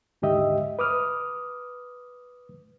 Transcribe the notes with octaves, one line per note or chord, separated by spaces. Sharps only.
D#2 G#2 D3 G4 D#5 E5
B4 D6 D#6 F6